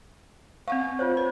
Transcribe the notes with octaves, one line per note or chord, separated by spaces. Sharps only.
C4 F5 F#5 C#6
F4 C5 C#5
B4